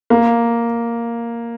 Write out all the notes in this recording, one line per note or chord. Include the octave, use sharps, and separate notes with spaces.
A#3